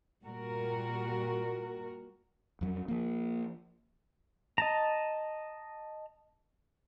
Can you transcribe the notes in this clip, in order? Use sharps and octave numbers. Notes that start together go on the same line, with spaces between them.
A#2 G3 F#4 A#4
F2 F#3
F3 A#3
D#5 A5 A#5